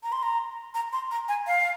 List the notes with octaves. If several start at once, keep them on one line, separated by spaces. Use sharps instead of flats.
A#5
C6
A#5
A#5
C6
A#5
G#5
F5